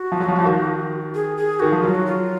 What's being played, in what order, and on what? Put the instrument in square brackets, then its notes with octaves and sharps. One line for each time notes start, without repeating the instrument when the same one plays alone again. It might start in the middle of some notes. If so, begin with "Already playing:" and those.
Already playing: [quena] F#4
[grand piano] F3
F#3
F3
F3
D#3
[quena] G#4
G#4
[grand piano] D#3 [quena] F#4
[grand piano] F3
[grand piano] F#3 [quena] F4
[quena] F#4
F4